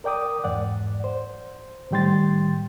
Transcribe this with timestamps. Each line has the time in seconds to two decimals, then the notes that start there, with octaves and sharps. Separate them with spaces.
0.04 A#4 D5 G5 D6 D#6
0.44 E2 G#2 D5 F#5
1.04 C5
1.91 A2 D#3 G3 G5 C6 A6